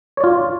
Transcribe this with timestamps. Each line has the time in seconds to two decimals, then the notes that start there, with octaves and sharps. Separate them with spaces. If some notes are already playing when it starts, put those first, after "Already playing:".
0.17 C#5
0.21 D5
0.24 F4